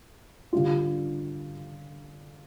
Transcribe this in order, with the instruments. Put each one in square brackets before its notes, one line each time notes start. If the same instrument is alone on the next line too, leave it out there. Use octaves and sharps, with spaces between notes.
[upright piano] D3 G3 D4 F4